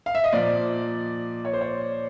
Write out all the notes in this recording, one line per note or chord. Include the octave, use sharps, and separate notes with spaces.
F5
E5
D#5
A#2 F3 D5
C#5
C5
C#5